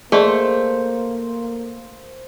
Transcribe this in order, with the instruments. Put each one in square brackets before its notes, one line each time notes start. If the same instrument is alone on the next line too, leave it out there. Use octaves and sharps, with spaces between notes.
[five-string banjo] A3 [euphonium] A#3 [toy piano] G#4 D5 D#5 [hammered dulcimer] C5